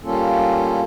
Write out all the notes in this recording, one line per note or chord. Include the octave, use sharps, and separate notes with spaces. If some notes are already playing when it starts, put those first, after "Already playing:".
G3 A#3 C#4 F4 A4